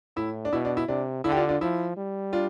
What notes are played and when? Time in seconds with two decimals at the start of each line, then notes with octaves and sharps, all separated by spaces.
0.17 A2 E4
0.45 D4
0.52 B2 E4
0.65 D4
0.77 E4
0.88 C3 D4
1.24 D3 E4
1.32 G4
1.37 D4 F4
1.49 D4 F4
1.61 F3 E4
1.97 G3
2.33 D4 F4